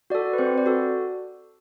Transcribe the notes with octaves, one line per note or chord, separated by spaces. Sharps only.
F#4 A4 D5
B4
C4 C5
D5
F#4 A4